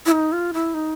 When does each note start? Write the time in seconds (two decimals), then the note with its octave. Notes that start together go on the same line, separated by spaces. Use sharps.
0.06 E4
0.12 D#4
0.32 F4
0.54 E4
0.74 D#4